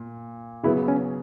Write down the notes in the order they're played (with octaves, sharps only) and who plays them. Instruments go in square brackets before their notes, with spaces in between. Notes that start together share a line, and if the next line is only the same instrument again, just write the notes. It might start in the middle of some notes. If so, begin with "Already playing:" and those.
Already playing: [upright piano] A#2
[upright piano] C#3 F#3 B3 [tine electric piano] E4
[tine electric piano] C#4